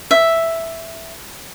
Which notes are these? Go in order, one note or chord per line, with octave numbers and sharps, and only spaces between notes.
E5